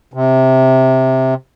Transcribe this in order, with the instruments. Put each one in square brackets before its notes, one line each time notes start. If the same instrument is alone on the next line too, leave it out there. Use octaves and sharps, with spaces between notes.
[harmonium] C3